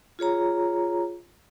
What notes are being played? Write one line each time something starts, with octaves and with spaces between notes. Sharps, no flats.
F4 G#4 C#5 A#5